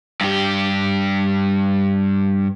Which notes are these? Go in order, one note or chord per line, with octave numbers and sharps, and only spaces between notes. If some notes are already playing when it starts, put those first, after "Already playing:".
G2 G4